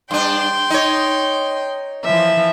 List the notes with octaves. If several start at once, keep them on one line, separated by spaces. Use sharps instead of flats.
G2 D4 G5 C6
D#4 C#5
E3 F3 E5